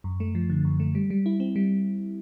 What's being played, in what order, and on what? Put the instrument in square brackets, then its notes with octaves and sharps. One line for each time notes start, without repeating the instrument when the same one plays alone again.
[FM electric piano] F#2
A3
F3
D3
F#2
A3
G3
G3
E4
C4
G3